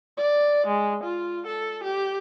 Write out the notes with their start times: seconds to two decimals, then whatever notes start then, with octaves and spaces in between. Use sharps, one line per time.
0.17 D5
0.67 G#3
1.04 F4
1.47 A4
1.84 G4